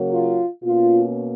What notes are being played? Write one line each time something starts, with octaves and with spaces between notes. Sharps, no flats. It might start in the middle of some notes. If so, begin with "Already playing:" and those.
Already playing: C#3 F#3 A#3
F4
B2 A#3 C#4 F4